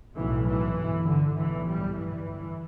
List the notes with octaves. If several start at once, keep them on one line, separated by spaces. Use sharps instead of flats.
B1 A2 E3
E3
G1 G2
D3
B1 A2 E3
G3
G1 G2 E3